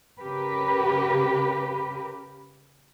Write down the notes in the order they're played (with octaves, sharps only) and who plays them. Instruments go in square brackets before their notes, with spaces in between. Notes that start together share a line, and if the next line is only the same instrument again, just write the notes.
[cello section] C#3 G4 A#4 B4